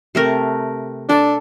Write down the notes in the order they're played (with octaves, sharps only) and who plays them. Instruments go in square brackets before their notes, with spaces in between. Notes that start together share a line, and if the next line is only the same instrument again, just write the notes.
[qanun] C3 A3 A#4
[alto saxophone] D4 [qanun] A4